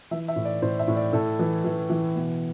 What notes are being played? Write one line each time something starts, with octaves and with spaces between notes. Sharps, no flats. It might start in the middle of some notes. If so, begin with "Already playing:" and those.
E3 E5
E5
A2
D5
A2 C5
E5
A2
D5
A2 A4
E3
E3
E3
B2